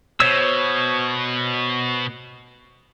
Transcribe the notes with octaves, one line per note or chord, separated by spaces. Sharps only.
B2 C5 C#5 E6